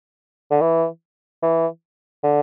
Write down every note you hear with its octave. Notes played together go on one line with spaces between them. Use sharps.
D3
E3
E3
D3